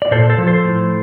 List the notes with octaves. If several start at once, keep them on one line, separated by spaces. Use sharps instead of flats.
D5
A#2 A4 C5
A4 C5
F3
A4 C5
A2